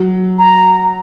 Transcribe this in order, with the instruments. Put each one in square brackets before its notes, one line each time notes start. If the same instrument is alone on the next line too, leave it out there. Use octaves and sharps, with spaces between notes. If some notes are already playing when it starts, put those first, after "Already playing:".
Already playing: [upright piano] F#3
[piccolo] A#5